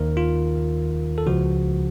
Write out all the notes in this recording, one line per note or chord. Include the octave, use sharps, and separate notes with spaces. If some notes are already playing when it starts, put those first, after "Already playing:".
Already playing: D#2 D#3 A#4
F4
A4
C#2 C#3 F3 F#4